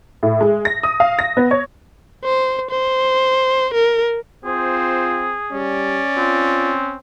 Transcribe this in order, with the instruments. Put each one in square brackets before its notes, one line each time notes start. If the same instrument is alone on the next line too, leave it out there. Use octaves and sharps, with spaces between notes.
[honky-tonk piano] A2
G#3
A#6
D#6
F5
A#6
B3
C#5
[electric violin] C5
C5
A#4
[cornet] C4 [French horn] F4 [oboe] G#4 [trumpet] C5
[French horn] G3 [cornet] C#4 [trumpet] D5
[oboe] C4 [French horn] F4